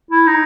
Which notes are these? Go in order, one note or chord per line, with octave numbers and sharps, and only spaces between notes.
E4
D#4